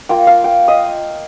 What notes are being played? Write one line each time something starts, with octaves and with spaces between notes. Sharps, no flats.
A#3 F4 G5
F5
G5
D#5